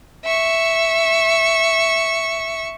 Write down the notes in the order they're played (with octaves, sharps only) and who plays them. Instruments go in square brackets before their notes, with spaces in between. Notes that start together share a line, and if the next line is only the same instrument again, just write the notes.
[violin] E5 C#6